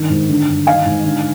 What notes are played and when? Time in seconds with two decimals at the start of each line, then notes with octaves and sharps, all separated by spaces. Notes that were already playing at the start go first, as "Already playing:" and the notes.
Already playing: G2 D#3
0.10 G#2
0.30 D3
0.48 G2
0.67 D#3 F5 G#5
0.86 G#2
1.05 D3